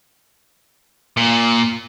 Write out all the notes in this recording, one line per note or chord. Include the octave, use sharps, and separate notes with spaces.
A#2